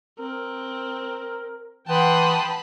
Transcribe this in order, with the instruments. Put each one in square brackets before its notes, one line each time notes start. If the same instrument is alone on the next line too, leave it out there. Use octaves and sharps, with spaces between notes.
[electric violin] C4 [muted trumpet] A#4
[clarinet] E3 [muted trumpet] F#5 [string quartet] G5 C6 D#6 [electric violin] A5 B5